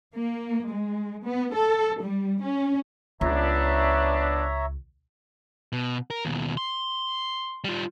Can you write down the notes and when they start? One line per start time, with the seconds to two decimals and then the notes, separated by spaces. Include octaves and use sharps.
0.15 A#3
0.66 G#3
1.24 B3
1.54 A4
2.01 G3
2.42 C#4
3.21 C#2 B3 D4 C#5 E5 A#5
5.73 B2
6.10 A#4
6.25 D#2 B2
6.57 C6
7.64 G3 F4